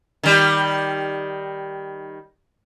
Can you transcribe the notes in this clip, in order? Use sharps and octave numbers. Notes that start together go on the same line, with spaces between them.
D#3 G3